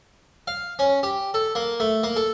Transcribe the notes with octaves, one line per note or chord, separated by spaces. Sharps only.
F5
C#4
G4
A4
A#3
A3
A#3
A4